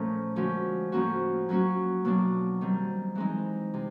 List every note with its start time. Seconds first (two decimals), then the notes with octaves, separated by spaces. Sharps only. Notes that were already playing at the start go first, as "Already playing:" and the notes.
Already playing: A#2 F3 A3 C#4
0.36 D3 F3 G#3 C#4 F#4
0.92 A2 F3 A#3 C#4 F#4
1.49 F#3 A#3 C#4 F#4
2.05 B2 F#3 A#3 D4
2.61 D#3 G3 C4
3.15 E3 G#3 C4 D#4
3.74 C3